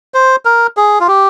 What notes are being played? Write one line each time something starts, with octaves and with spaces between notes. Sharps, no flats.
C5
A#4
G#4
F4
G4